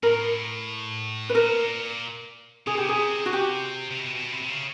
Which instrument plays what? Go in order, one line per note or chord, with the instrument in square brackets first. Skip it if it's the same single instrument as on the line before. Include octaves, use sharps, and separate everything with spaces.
[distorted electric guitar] A2 [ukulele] A#4
[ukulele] B4
[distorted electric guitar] A#2 [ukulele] A#4
[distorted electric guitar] C3 [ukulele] G#4
[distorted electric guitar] B2 [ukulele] G4
[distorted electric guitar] C3 [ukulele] G#4
[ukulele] F#4
G4
[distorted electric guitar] C3
B2
B2
C3
C3
C#3